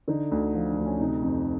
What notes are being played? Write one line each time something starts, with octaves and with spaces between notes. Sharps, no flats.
D3 D#4
D2
F3
D4
D2
C#4
C3 D#4
F2